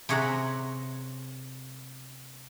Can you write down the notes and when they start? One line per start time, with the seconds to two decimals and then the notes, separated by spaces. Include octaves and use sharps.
0.09 C3 G#4 C#5 E5 F#5 A#5